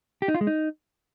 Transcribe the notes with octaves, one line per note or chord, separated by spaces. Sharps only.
G4
D#4
F4
G#3
D#4